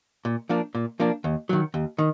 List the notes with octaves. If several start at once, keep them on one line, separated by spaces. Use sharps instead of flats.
A#2
F3 A#3 D4
A#2
F3 A#3 D4
D#2
D#3 F#3
D#2
D#3